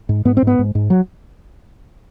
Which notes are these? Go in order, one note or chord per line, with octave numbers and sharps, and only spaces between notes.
G#2
G#2 B3
C4
G#2 B3
G#2
G#2
F#3